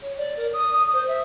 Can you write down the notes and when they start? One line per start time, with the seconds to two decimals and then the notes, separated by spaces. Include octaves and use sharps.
0.02 C#5
0.18 D5
0.37 A#4
0.53 D#6
0.74 D#6
0.93 C5
1.08 E5